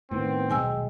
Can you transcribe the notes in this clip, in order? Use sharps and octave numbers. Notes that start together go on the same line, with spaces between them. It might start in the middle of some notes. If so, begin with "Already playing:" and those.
A2 D#3 B3 C4
D#1 B1 G#3 G5 G#5 E6